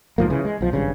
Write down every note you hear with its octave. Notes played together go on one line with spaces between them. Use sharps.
C2 G#2 F3 A#3
C#3 E3
G#3
B1 F3
G#1 G2 C#3